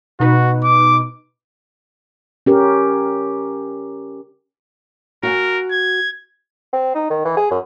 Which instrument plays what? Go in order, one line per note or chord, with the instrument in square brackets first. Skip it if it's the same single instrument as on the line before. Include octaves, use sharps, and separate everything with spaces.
[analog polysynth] B2 D#4 B4 [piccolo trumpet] F#4
[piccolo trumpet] D6
[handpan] C#4 G4 A#4
[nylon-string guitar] F#4 F5 G#5 [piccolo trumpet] A#4
[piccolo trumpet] G#6
[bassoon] C4
D#4
D#3
E3
G#4
F#2